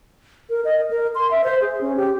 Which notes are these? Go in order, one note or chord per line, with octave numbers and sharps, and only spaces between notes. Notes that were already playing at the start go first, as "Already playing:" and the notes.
A#4
D#5
A#4
C6
E5
C5
G#4
C#4
G4